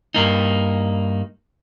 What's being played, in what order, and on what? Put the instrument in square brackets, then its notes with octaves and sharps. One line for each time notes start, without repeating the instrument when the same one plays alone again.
[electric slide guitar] G2 A#3 D#4